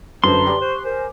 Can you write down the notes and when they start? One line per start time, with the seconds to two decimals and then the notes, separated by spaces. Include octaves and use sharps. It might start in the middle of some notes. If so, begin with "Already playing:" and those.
0.24 F#2 D3 B4 C5 A5 A#5 C6
0.46 G4 D5
0.61 C5 C#6 F#6
0.83 A#4 C5 G#5